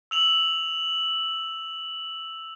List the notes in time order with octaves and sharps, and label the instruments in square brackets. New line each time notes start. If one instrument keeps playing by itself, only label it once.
[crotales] E6 F7 F#7